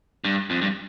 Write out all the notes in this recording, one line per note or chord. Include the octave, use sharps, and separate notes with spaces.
G2
F2
G2